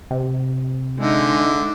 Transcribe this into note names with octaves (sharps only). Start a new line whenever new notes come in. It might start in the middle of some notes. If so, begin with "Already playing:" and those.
C3
D3 G#3 D#4 E5